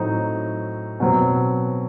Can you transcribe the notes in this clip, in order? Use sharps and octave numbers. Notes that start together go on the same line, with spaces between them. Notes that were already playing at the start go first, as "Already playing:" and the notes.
Already playing: A2 F#3 C4 D#4
B2 F#3 C4